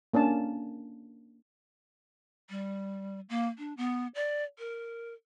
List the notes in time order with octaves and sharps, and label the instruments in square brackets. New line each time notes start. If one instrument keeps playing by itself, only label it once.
[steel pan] A#3 C#4 D4 A5
[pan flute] G3
A#3
D4
B3
D5
A#4